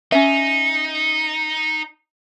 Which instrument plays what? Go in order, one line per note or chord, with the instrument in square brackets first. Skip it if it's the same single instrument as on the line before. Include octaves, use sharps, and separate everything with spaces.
[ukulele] C#4 E5 [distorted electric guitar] D#4